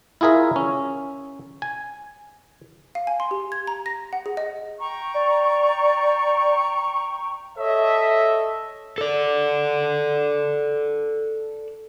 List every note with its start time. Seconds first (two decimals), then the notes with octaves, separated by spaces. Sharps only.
0.21 E4 F4 G#4 A#4 E5
0.56 C#4
1.62 G#5
2.95 F5
3.07 G#5
3.20 C6
3.31 G4
3.52 G#6
3.67 A#5
3.86 A#6
4.13 F#5
4.26 G#4
4.37 D#5
4.80 G5 A#5 C#6
5.14 D5
7.58 A4 C#5 D#5 E5
8.98 A4 D5